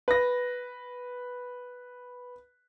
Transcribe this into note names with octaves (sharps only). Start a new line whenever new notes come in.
B4 A#6